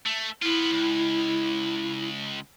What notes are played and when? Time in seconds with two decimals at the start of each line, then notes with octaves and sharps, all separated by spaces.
0.06 A3
0.42 B3 E4 F4
0.70 C#2